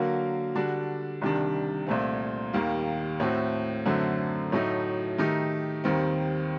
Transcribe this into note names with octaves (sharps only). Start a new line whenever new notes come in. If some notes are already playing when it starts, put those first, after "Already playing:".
Already playing: D3 F#3 A#3 F#4 A#4
D3 G3 D4 F#4
C2 C3 D#3 G3 D4
C2 A#2 A3 C4
D#2 D#3 G3 A#3
A2 A3 C4 F#4
F#2 D3 A3 C4 F#4
A2 F#3 A3 D#4
D#3 A3 D#4 G4
D#2 D#3 G3 C4